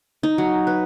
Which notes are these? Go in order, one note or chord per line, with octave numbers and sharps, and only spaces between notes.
D#4
F#3
B4